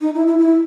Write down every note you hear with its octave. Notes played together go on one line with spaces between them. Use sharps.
D#4
E4
E4
E4